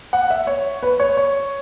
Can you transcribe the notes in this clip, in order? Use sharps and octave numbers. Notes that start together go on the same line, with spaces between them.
F#5
E5
C#5
B4
C#5
C#5